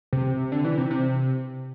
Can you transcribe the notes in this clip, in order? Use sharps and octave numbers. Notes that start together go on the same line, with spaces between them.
C3
D3
E3
C3
C3